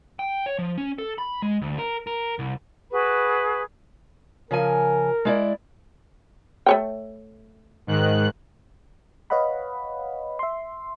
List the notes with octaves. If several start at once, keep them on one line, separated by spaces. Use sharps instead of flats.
G5
C#5
F3
C#4
A4
B5
G#3
D2
A#4
A#4
C2
F#4 G#4 B4 B5
C#3 F3 A#4 G#5
G#3 E4 D5
A3 C#5 G5
G#2 D#3 F#6
B4 C#5 D#5 F5 F#5 B5
E5 C6